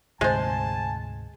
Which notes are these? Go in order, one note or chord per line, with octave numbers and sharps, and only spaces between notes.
D2 G#2 C3 G#3 C5 G#5 A5